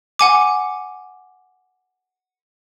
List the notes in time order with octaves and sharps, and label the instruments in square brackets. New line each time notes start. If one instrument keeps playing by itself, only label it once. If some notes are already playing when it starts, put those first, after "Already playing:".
[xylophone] F#5 G#5 D6